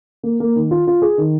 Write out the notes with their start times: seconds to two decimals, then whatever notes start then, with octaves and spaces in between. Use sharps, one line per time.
0.23 A#3
0.40 A#3
0.56 D#3
0.71 F4
0.87 F4
1.02 G#4
1.18 D#3